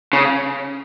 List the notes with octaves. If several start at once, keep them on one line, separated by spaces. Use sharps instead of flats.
C#3